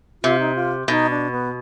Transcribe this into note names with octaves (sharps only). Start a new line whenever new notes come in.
C3 F4
D#4
F4
B2 D#4
D4
B3